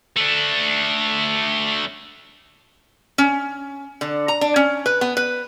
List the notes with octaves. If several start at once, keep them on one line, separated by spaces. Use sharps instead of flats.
A3 D4
C#4
D3
A#5
D4
C#4
B4
B3
B4